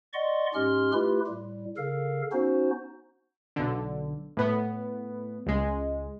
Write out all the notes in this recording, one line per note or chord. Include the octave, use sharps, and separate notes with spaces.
D5 D#5 F#5 C6 C#6
G#2 G#3 C#4 G4 C6 F6
A3 E4 F4 G4 B4
A2 G3
C#3 A4 A#4 F5
B3 C#4 D#4 F#4 C5
B1 D3
A2 B3
C#2 G#3